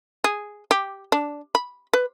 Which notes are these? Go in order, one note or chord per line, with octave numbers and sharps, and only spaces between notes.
G#4
G4
D4
B5
B4